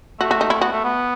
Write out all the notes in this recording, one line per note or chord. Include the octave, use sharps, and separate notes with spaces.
A3 F#4
F#4
D#4
E4
B3 F#4
A3
B3